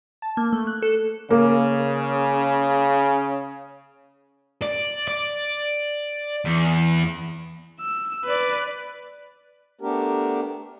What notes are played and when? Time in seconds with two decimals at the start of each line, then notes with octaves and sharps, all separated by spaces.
0.22 A5
0.37 A#3
0.53 A3
0.67 F#6
0.82 A4
1.31 C#3 A#3
4.63 D5
5.08 D5
6.45 E2
7.80 E6
8.25 B4 D5
9.81 A3 B3 D4 G4 A#4